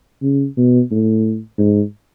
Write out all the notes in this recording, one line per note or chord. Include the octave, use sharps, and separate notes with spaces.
C#3
B2
A2
G#2